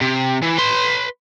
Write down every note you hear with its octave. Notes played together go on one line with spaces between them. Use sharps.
C3
E3
B4 C6